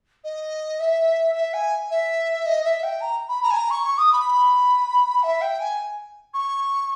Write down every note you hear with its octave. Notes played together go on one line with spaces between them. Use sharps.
D#5
E5
E5
G#5
E5
D#5
E5
G5
A#5
B5
A#5
G#5
A#5
C#6
C#6
D#6
B5
E5
G5
G#5
C#6